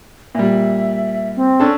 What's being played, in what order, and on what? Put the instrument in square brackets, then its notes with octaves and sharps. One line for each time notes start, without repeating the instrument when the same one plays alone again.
[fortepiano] A#2 G3 [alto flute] E5
[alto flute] C4
[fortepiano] C#4 D4 A4